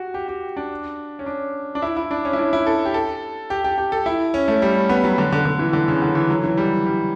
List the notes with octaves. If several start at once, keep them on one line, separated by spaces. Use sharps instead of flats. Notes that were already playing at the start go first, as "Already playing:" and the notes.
Already playing: F#4 G4
G4
G4
D4
C#4
D4
D4
E4
E4
D4
C#4
E4
D4
E4
A4
G4
A4
G4
G4
G4
A4
E4
C#4
A3
G3
C#4
B3
F#3
D3
D3
D3
E3
D3
C#3
D3
E3
F#3
E3
G3
G3